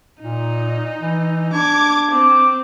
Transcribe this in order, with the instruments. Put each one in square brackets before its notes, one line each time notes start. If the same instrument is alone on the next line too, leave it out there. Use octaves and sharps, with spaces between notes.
[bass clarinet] A#2 [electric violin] D#4
[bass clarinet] E3
[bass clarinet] D4 [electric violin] D6 G#6
[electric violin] C4 [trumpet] D6